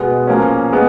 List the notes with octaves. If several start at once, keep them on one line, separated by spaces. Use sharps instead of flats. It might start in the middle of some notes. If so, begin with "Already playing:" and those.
Already playing: B2 G#3 B3
A#2 F3 A#3 C#4
G#3 B3